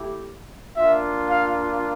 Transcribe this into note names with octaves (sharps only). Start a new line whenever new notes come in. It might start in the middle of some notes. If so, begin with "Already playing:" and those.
Already playing: A3 E4 G4
A#3 D4 F4 E5
F5